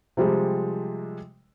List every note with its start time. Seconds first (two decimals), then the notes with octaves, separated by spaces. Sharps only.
0.17 C3 F3 G3 G#3